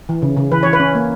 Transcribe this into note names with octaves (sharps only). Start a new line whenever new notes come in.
E3
C#3
C#3
E3 B4
E3 C#5
B4
C#4
A#3